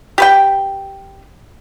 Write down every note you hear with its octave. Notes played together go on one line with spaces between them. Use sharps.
G4 B4 G5